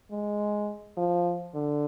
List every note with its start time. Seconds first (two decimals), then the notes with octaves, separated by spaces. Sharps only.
0.11 G#3
0.97 F3
1.55 D3